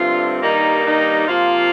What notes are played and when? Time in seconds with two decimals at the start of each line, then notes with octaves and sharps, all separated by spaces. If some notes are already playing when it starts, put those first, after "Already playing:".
Already playing: G2 D3 A3 C4 F4
0.42 G2 D#3 G3 A#3 D#4
0.85 D#4
1.27 C3 F3 A#3 F4